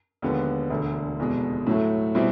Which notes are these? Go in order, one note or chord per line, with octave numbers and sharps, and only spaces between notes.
D#2 D3 F3 G#3 B3
E1 D2 D3
F1 E2 B2 G#3
A2 F#3 A3
B2 G3 C4 E4